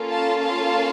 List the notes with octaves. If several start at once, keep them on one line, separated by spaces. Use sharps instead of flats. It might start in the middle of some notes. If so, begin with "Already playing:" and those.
Already playing: A#3 C#4 F4 A4
F5 A5
F5 A5